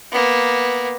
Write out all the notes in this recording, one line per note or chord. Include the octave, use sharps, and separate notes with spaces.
A#3 B3